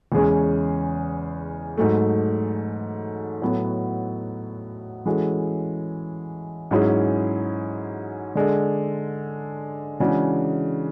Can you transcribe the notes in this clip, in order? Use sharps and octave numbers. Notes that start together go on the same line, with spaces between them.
E2 C#3 G#3 C#4 G#4
G#2 F#3 A3
A2 F#3 B3 F#4 A4
E3 G#3 C#4 F#4 A4
G#2 F#3 C#4 E4 G#4
D3 G#3 D4 A4
C#3 E3 G#3 D4 F#4